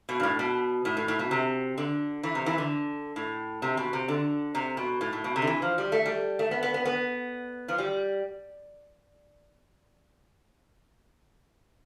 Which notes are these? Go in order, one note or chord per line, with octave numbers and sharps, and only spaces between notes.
B2
G2
A2
B2
A2
A2
A2
B2
C3
D3
E3
C3
E3
D3
A2
C3
B2
C3
D3
C3
B2
A2
A2
B2
C3
D3
E3
F3
G3
A3
G3
A3
B3
B3
B3
B3
F3
G3